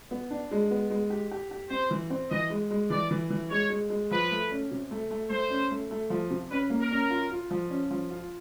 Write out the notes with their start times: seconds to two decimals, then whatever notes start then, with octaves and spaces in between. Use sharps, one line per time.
0.11 B3
0.31 D4
0.51 G#3
0.71 B3
0.90 G#3
1.10 G4
1.31 G4
1.51 G4
1.70 C4 C5
1.91 E3
2.10 C4
2.31 E3 D#5
2.50 G#3
2.71 G#3
2.90 E3 D5
3.11 E3
3.30 E3
3.50 G#3 C#5
3.70 G#3
3.90 G#3
4.11 F3 B4
4.31 A3
4.51 C#4
4.71 C3
4.91 A3
5.11 A3
5.30 A3 C5
5.50 C#4
5.71 A3
5.91 A3
6.10 F3
6.31 C3
6.50 C#4 B4
6.70 A#3
6.81 A#4
6.91 C#4
7.10 F4
7.31 F4
7.51 F3
7.70 C#4
7.91 F3
8.11 F4